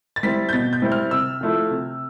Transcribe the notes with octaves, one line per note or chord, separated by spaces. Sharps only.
A6
G3 C4 E4 B6
G6
B2 A6
G6
G3 C4 E4
F6
C3 E6
F3 A3 E4
C3